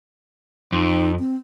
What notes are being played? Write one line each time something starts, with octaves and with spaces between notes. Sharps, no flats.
F2 D#4
C4